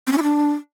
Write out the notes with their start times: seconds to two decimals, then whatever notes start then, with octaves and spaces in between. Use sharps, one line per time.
0.07 C4
0.12 C#4
0.17 E4
0.23 D4